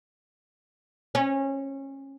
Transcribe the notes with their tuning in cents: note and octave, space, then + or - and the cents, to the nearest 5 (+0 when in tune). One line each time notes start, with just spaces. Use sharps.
C#4 -25